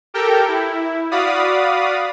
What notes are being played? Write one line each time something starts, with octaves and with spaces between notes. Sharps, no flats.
G4 A4 A#4 G5
E4
F#4 D5 F5 B5 D#6